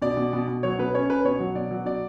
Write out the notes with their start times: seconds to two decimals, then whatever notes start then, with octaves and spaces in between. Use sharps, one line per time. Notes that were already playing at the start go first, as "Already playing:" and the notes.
0.02 B2 D5
0.17 B2
0.33 B2
0.48 B2
0.63 F#3 C#5
0.78 B2 B4
0.94 C#4 C#5
1.10 C#4 B4
1.24 B2 C#5
1.40 F#3
1.55 B2 D5
1.71 F#3
1.86 B2 D5